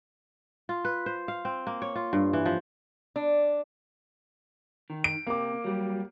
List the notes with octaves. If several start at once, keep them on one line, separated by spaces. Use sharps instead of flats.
F4
B4
C5
F5
C4
A#3
C#5
F4
G2
E3
F3
D4
D#3
D7
C3 A#3 D6
F#3 G3